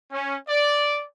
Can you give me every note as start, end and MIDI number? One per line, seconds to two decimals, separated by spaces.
0.13 0.37 61
0.49 1.04 74